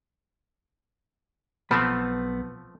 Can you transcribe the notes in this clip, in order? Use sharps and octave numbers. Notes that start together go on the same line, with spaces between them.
B1 F3 A3 B3 C4 B5